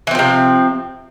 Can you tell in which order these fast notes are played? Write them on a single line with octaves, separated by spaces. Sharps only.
E3 C4 F3 C3